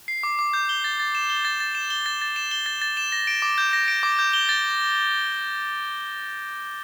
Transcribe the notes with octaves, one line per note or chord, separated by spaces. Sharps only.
C7
D6
D6
G6
G7
A6
A6
E7
G7
A6
A6
E7
G7
A6
A6
E7
G7
A6
A6
E7
A#6
D7
D6
G6
A#6
D7
D6
G6
G7
A6